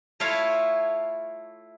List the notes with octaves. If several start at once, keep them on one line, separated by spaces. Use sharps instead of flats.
A3 E4 F4 C#5 F5